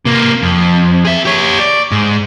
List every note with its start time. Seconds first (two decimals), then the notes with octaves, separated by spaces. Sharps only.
0.05 C3 A#3
0.43 F2
1.05 G#4 E5
1.25 G4 C#5
1.60 D5
1.92 G#2